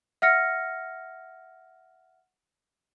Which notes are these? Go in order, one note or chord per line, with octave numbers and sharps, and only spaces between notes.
E5 F#5 F6 A#6 C#7